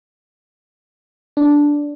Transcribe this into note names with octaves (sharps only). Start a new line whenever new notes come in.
D4